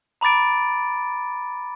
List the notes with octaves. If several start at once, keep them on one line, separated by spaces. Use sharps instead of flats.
A#5 B5 D6 A6 D7